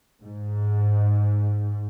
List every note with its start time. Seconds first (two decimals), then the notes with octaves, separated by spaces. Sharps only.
0.23 G#2